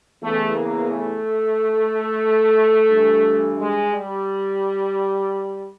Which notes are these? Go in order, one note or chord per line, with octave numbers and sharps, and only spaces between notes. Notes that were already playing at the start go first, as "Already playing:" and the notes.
E2 C#3 E3 A3
A#3
A3
G2 E3
G#3
G3